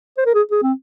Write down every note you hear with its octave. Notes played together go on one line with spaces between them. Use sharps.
C5
A#4
G#4
G#4
C4